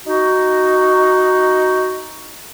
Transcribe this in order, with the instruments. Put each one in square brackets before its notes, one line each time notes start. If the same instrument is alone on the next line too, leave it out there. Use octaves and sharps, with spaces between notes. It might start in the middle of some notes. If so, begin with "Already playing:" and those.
[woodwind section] D#4 F#4